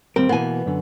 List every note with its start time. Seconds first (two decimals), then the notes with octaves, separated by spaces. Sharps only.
0.16 D#2 G3 C4 A#4
0.29 B2 E3 A#3 B3 G#5
0.66 F#2 D3